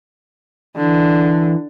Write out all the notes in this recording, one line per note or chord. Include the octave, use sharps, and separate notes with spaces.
D3 E3